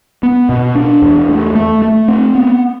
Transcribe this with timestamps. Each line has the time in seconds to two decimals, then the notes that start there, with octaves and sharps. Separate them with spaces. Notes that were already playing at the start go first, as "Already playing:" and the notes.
0.23 B3
0.49 B2
0.75 D4
1.02 E2
1.29 A3
1.55 A3
1.82 A3
2.08 C4
2.35 B3